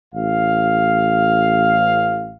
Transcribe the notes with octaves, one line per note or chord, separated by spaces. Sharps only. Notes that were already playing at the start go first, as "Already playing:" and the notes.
A1 F5